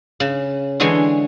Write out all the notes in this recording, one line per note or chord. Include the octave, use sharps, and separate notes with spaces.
C#3
D3 E3 G#3 C#5 G5 C6